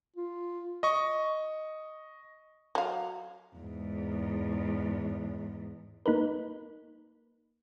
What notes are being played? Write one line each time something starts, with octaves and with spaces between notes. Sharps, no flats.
F4
D#5 C#6
F#3 F5
E2 G#2
A#3 D#4 A#4 B4